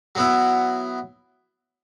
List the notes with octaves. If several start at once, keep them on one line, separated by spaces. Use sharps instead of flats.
F#3 B3 E4